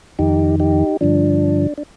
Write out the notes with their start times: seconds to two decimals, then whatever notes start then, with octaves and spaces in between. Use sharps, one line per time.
0.19 F2 D#3 D#4 G4
0.60 D#4 G4
1.01 G2 D3 F3 D4
1.78 D4